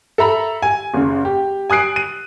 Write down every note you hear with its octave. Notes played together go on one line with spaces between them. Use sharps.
A4 E5 A#5 B5
G#5
F#1 C#3
G4
G#5 D#6 F#6 C7 D7
D#7